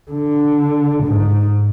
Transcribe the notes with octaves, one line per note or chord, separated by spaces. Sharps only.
D3
G#2